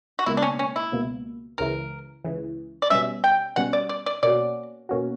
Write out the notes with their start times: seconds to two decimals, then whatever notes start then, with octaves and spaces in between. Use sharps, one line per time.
0.19 F#4
0.26 C#2 B2 A#3 E4
0.37 D4
0.42 C#4
0.59 C#4
0.76 E4
0.92 C#2 B2 A#3
1.58 C#2 C#3 E3 A#4
2.25 C#2 C#3 E3
2.82 D5
2.90 B2 G3 C#4 E5
3.24 G5
3.56 B2 G3 C#4 F#5
3.73 D5
3.89 D5
4.06 D5
4.23 B2 A#3 C#4 F#4 D5
4.89 B2 A#3 C#4 F#4